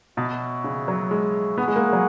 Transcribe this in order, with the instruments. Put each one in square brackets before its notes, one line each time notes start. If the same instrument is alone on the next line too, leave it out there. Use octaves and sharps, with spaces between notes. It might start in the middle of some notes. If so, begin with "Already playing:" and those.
[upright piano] B2 [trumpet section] F#4 C#5 E5
[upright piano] C#3
F#3
G#3
[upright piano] B3 [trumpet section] E4 G#4 C#5 F#5
[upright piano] G#3
A#3
F#3